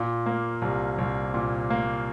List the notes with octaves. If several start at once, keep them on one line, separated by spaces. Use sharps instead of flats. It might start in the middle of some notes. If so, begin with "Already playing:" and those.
Already playing: A#2
A#3
C2
C2
A#2
A#3